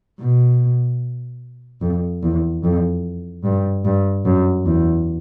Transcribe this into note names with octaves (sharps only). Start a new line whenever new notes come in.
B2
F2
E2
F2
G2
G2
F#2
E2